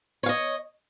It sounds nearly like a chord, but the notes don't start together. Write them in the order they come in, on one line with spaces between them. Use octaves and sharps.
C#5 F5 D#5